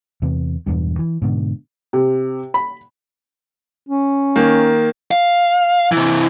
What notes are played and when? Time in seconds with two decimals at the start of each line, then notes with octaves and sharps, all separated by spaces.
0.22 E2 C3
0.67 E1 E2 G2
0.99 E3
1.22 G#2 B2 D3
1.93 C3
2.54 B5
3.89 C#4
4.36 D#3 A#3
5.11 F5
5.92 C3 E3